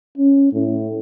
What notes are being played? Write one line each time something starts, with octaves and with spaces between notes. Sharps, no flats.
C#4
A2